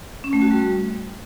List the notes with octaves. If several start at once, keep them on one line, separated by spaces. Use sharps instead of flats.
C#4
A3
F#4
G3